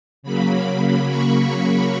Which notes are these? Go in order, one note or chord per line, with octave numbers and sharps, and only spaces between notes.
C#3 F#3 A#3 B5
C#6